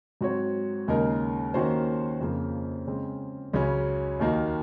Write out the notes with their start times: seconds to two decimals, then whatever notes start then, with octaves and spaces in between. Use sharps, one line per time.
0.21 G#2 F#3 C4 F#4 C#5
0.88 D#2 C#3 G#3 D#4 A#4
1.54 D#3 A#3 C#4 F#4 C5
2.20 F2 C#3 F3 A#3
2.87 C#3 G#3 C4
3.53 C#2 C#3 F#3 C#4
4.20 D#2 D#3 A#3 D#4 F#4